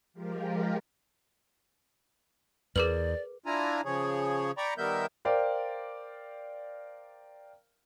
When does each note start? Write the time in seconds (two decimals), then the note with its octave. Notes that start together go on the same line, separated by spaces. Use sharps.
0.13 F3 G#3 F4 G4 A#4
2.76 E2 G#4 A#4 B4 D5 D6 F#7
3.46 D4 E4 F4 G#5 A#5
3.85 C#3 F3 G#4 C#5
4.58 D5 G5 A#5 B5 C#6
4.78 D#3 G3 B3 A#4 E5 G6
5.25 A#4 C5 D5 F5 G5